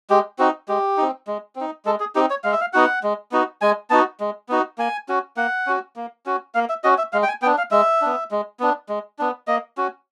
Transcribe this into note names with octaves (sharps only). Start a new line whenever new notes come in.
G#3 G4
C4 D#4 F#4
G#3 G4
C4 D#4
G#3
C4 D#4
G#3 A4
G#4
C4 D#4 G4
C#5
G#3 F5
E5
F5
B3 D#4 F#4 F#5
G#3
B3 D#4 F#4
G#3 G#5
B3 D#4 F#4 A5
G#3
B3 D#4 F#4
A#3 G#5
C#4 F#4
A#3 F#5
C#4 F#4
A#3
C#4 F#4
A#3 F5
E5
C#4 F#4 D#5
E5
G#3 F5
G5
G#5
B3 D4 G5
F5
G#3 E5
B3 D4
G#3
B3 D4
G#3
B3 D4
A#3 D#5
C#4 F#4